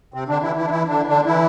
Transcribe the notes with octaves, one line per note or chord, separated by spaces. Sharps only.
C3 C4
D3 D4
E3 E4
E3 E4
D4
E3 E4
D3 D4
D3 D4
E3 E4